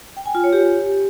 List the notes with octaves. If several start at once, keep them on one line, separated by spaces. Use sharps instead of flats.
G5
G#5
F4
C#5
G4